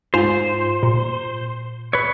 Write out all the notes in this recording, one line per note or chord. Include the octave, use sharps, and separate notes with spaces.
G#2 F4 C5
A#2
B4 C#5